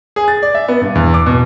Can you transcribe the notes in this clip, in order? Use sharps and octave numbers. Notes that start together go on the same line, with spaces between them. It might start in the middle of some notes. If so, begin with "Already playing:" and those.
G#4
A6
D5
E5
B3
G2
E2
D6
B2